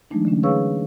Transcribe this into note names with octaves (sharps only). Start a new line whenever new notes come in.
E3 F#3 G#3 A3 D4 D#4
D3 A3 C#4
G#4 B4 C#5 F5 C#6 E6